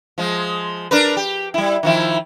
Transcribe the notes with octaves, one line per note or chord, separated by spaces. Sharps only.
F3 G#3
D4 A#4 B4
G4
G3 E4
D#3 F3 E4